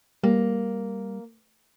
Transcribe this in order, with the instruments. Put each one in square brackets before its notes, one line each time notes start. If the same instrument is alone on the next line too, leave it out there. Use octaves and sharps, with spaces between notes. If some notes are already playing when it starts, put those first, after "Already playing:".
[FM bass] G3 [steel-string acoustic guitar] A#3